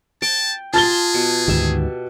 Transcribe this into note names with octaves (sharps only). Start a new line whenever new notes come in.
G5 A5
F4 G#4 A5 A6 G7
B2
D2 G#2 D#3 G4 E5